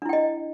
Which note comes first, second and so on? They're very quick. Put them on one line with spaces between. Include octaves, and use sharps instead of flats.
D4 E4 G5 D#5